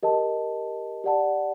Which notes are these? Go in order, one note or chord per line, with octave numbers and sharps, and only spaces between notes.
G4 A#4 D#5 A5
G4 D5 F#5 A5